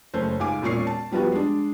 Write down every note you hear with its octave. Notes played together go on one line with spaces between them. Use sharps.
F#1 A3 C#4 C5
C#2 G#2 F5 G#5 D6
E1 A#2 C#4 C#6 C7
A5
F3 G3 B3 F4 F#4
G#3 D4